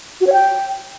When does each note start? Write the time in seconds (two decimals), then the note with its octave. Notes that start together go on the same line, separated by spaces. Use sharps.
0.21 F#4
0.27 C#5
0.33 G5